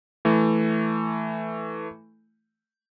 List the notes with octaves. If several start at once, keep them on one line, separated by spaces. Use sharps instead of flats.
E3 A3